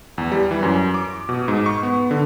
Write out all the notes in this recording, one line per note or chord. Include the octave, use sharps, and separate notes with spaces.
E2
G3
E3
F#2
D6
B2
G#2
C#6
B3
D3